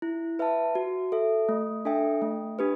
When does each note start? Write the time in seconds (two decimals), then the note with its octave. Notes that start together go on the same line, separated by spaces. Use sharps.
0.02 E4
0.39 B4 E5 A5
0.75 F#4
1.12 A4 E5
1.49 A3
1.85 D4 A4 E5 G5
2.22 A3
2.59 D4 G4 B4